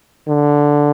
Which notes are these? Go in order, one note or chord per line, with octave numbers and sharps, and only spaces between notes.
D3